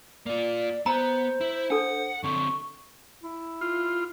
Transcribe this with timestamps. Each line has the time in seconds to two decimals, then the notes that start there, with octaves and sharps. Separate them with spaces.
0.26 A#3 F4 D5
0.86 B3 C5 A#5
1.41 E4
1.70 D4 A4 F#5
2.24 D3 C4 C#6
3.23 E4
3.61 F4